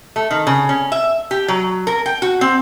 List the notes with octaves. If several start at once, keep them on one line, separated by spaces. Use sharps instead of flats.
A3
D#3
C#3
C#4
E5
G4
F#3
A#4
G5
F#4
C4